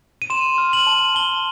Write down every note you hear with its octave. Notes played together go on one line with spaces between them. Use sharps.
D#7
C6 E7
F6
F#7
A5
A5 G7